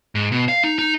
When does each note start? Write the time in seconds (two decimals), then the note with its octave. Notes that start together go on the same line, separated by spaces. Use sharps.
0.15 G#2
0.32 B2
0.49 F5
0.64 D#4
0.79 D#4